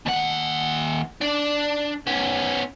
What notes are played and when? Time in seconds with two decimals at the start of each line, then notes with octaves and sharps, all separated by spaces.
0.06 D#2 F#5
1.21 D4 D5
2.07 B3 C#4